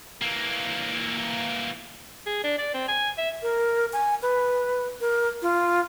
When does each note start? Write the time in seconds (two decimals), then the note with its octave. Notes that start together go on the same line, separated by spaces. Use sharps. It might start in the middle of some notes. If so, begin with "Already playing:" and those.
0.22 E3 A#3
2.26 G#4
2.44 D4
2.58 D5
2.74 C4
2.88 G#5
3.18 E5
3.42 A#4
3.93 G#5
4.22 B4
5.01 A#4
5.42 F4